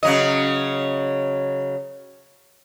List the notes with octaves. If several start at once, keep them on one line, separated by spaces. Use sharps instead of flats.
C#3 F#3 D#5